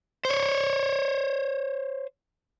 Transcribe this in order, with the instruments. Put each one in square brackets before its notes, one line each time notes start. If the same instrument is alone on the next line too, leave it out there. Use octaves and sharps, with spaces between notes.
[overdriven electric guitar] C5 C#5